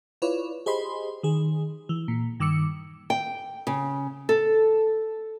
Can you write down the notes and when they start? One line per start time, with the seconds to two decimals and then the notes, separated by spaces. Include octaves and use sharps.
0.22 E4 F4 B4 C#5 D5
0.66 G4 G#4 C5 D#5 B5 C6
1.23 D#3 G#4
1.89 E3
2.08 A#2
2.40 G2 D#3 D6 E6 C#7
3.10 G5
3.67 C#3
4.29 A4